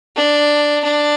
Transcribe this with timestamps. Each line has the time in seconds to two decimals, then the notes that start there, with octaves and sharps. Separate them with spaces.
0.16 D4
0.84 D4